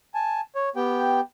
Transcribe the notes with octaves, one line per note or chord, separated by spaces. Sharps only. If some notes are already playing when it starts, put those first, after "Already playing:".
G#5 A5
C#5
B3 G4 G5